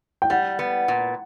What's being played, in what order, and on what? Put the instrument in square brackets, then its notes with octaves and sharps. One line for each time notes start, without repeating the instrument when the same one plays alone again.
[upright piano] G5
[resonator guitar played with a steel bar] G3 [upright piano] F#5
[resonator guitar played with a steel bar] B3
A#2